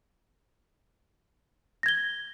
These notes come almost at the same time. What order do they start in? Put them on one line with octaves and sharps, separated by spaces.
A#6 G#6 G7